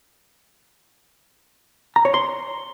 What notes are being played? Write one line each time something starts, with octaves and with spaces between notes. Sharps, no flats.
A#5
C#5
C6